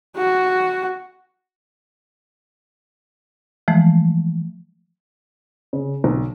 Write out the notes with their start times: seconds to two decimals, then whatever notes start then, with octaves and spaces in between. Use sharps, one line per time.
0.17 F#4
3.68 E3 F3 G#3 A3
5.73 C#3
6.04 B1